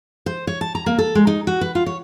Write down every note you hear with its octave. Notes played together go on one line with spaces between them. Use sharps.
C5
C#5
A5
A#5
A#3
A4
G#3
D#4
F#4
B4
F4
C#5